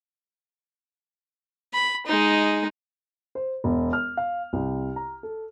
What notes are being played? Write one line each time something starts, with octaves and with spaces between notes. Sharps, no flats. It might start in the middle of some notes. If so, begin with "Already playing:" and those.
B5
G#3 D#4
C5
E1
F6
F5
C2
A#5
A4